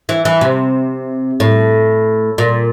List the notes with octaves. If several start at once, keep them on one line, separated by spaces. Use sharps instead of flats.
E3
E3
C3
A2
A#2